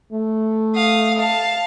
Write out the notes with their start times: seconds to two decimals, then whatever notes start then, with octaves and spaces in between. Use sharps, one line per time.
0.12 A3
0.75 F5 D#6
1.18 F5 A5